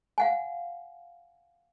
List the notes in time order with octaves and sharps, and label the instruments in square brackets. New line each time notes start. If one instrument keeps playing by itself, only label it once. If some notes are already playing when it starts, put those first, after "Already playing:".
[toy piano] F5 F#5 G#5